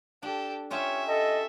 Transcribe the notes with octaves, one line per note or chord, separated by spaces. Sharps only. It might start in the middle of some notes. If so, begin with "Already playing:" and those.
D4 G4 A4
C#4 F4 G4 C#5 E5
A4 D#5